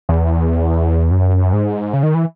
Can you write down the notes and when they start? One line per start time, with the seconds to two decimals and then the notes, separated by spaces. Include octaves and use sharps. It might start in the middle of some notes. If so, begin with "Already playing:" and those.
0.09 E2
1.11 F#2
1.53 G#2
1.93 C#3
2.03 D#3
2.14 E3